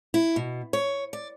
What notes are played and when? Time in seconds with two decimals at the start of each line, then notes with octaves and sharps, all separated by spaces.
0.14 E4
0.36 B2
0.73 C#5
1.13 D5